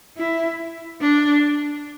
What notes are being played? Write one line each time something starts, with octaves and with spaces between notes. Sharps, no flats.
E4
D4